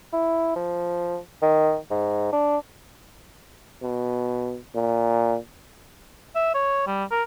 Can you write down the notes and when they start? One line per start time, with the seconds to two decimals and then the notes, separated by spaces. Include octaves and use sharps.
0.13 E4
0.56 F3
1.42 D#3
1.90 G#2
2.33 D4
3.82 B2
4.75 A#2
6.35 E5
6.54 C#5
6.87 G3
7.11 A#4